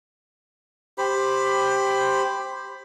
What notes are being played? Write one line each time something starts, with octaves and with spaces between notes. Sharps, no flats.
G4 C5 B5